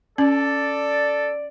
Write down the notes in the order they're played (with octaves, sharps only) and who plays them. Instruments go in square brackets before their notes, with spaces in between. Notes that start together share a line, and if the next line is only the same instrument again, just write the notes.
[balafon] C#4 [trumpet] A4 [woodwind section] D5